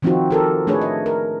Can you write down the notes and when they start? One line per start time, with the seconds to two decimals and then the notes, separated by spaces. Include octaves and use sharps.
0.02 D#3 F3 C4 D#4 F4 F#4
0.31 G4 A4 A#4
0.67 A3 D4 G#4 B4 C#5
0.81 D#5
1.06 A#4